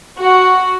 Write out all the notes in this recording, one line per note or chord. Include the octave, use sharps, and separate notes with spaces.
F#4